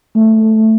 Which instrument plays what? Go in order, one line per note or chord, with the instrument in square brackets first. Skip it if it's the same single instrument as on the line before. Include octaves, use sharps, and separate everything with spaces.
[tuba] A3